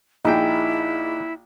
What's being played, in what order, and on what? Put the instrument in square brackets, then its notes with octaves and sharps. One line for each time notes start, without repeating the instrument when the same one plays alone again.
[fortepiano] A#1 G5 [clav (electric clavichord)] D#4 G#4 [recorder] E4